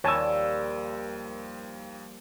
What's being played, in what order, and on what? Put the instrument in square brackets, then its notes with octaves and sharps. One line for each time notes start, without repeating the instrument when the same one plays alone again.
[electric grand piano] D#2 E6 [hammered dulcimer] F3 G3 A#3 [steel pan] C#5 G#5 A5